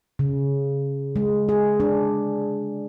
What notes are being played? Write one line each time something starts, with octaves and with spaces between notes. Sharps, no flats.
C#3
G#3
G#4
D4